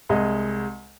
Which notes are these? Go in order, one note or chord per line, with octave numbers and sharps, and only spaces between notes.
C2 G#3 D#5